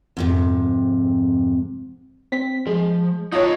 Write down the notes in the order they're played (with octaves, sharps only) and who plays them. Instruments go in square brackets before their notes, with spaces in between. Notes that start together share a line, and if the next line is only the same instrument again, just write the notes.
[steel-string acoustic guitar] F2 G#2 C3
[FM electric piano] C4 B6
[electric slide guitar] F3 [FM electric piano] G#3
[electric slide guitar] D#4 A5 A#5 [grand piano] F4 C#5 [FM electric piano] D#5